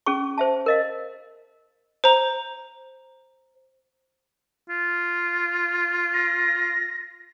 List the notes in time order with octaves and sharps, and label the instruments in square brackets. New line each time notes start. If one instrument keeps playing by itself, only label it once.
[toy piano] C#4 G#4 C#6
C5 E5 A5
A#4 D#5 F5
[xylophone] C5 A#5
[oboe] F4
[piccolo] A#6